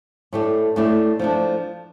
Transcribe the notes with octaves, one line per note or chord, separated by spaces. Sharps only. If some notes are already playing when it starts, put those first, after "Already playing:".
A2 A3 D4 G4
A2 A3 D4 G4
F3 A3 D4